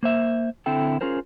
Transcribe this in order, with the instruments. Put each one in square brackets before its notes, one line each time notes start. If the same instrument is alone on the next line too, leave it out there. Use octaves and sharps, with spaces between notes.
[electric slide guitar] A#3 C5 E5
D3 C4 E4 A4 G5
C#4 F4 G#4 A#4 C5